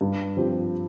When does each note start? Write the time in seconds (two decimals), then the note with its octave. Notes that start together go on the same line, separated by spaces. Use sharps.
0.01 G2
0.37 F3 C4 G4